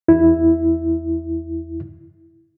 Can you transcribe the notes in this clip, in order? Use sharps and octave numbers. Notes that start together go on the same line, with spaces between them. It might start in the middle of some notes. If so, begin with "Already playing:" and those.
E2 E4